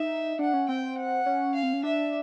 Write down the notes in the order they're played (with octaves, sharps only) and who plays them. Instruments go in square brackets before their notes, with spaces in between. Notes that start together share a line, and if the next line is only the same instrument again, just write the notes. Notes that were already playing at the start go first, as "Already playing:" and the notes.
Already playing: [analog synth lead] D#4 [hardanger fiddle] E5
[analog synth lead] D4 [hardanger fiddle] F#5
[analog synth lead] C#4
[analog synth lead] C4 [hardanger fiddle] G5
[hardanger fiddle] F#5
[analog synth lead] C#4
[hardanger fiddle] F5
[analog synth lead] C4
C#4
[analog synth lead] D4 [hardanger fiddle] E5